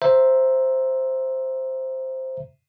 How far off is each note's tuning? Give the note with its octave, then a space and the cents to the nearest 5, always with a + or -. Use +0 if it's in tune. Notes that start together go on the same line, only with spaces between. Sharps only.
C5 +0 E5 +0 A#5 +0